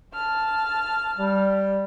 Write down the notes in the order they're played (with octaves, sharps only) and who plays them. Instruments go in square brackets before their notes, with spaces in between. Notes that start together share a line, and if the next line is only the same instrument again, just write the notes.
[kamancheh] A5 F6
[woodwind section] G3